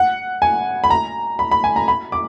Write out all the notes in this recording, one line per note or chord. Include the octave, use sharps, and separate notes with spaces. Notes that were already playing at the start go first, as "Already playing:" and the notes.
Already playing: F#5
G#5
B5
A#5
B5
B5
G#5
A#5
B5
D6